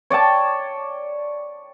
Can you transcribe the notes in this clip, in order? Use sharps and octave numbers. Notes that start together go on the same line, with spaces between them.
C#5 D5 G5 A5